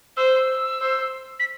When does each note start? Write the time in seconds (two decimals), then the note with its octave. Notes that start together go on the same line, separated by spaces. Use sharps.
0.17 C5 E6
0.80 C5
1.39 B6